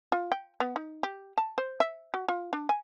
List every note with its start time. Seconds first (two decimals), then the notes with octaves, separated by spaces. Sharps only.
0.12 F4
0.32 G5
0.60 B3
0.76 D#4
1.03 G4
1.38 A5
1.58 C5
1.80 E5
2.14 F#4
2.28 F4
2.53 D4
2.69 G#5